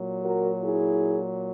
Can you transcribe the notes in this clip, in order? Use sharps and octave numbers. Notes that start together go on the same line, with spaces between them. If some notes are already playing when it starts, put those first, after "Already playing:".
Already playing: A#2 F#3
F#4 A#4
E4 G#4